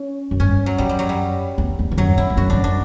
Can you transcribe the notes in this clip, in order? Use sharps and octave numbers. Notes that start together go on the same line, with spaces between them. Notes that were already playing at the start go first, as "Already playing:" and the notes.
Already playing: C#4
F#2
G2 C#4
F#3
F#2 G3
G3
F#3
G3
E2
E2
E2
F#2 F#3
F#2 E4
E2
F#2 F#4
E2 D4
F#2
D4